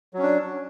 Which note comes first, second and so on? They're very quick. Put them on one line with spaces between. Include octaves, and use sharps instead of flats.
F#3 C#4 D4